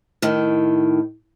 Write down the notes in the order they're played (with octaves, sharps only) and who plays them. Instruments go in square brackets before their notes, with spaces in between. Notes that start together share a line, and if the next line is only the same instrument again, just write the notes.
[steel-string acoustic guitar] A2 D#3